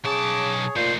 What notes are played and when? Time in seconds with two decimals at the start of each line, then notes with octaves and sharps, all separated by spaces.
0.05 B1 C#3 G#4 C#5 A5 D6
0.76 A#2 A3 D#4 C5